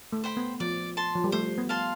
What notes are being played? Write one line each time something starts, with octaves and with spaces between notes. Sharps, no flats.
A3
C5 G5 B5
B3
F3 D5
A5 C6
F3
G3
A3 C5
B3
F5 A5 C6